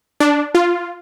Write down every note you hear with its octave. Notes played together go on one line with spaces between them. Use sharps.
D4
F4